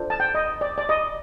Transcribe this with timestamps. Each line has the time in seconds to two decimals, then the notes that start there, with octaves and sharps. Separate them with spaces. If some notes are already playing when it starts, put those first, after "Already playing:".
Already playing: D4 F4 A4 C5
0.10 A5
0.20 G5
0.35 D#5
0.61 D5
0.78 D5
0.89 D#5